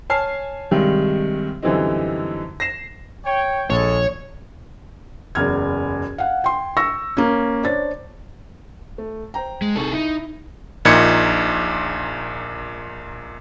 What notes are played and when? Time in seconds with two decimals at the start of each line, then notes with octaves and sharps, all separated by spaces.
0.10 C#5 G#5 A5 F6 C7
0.71 G2 C3 D#3 G3 G#3
1.62 F#2 D3 E3 G3 C4 D#4
2.60 A#6 C7 E7
3.25 C#5 G5
3.70 A#1 G#3 A4 C#5
5.35 F#1 E2 F6 G#6
6.18 F5 F#5
6.44 G5 C6
6.77 C#6 E6 A#6
7.17 A#3 C#4
7.64 D4 C5 C#5 A6
8.98 A3
9.34 C5 G5 A#5
9.62 G#3
9.76 C2 D#4 G#4 A4 C#6
9.93 D#4 E4
10.85 A#1 A#2 D#4 G#6 C#7